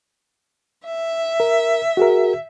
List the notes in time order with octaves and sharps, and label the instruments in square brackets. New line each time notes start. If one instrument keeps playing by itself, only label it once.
[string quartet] E5
[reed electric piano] A#4
F#4 G#4 A#4